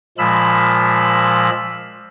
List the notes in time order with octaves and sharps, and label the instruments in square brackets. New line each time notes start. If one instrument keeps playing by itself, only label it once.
[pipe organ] A#2 F3 G#3 B5 E6